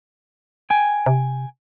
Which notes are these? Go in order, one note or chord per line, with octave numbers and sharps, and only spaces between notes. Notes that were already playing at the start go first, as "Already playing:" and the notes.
G5 G#5
C3